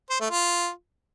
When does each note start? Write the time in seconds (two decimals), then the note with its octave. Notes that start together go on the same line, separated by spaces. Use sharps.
0.10 C5
0.20 A3
0.31 F4